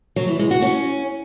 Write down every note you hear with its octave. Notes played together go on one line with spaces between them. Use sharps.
F#3
E3
G#3
F#4
C#4